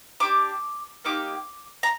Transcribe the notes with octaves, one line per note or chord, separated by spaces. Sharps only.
D4 G4 D6
A#3 D#4 G4 D6
A#5